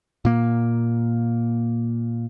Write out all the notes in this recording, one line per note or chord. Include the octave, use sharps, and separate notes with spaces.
A#2 A#3